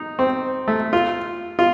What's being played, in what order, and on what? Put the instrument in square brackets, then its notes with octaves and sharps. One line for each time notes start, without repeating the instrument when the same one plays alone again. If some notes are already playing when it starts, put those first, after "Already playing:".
Already playing: [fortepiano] D#4
C4
A3
F4
F4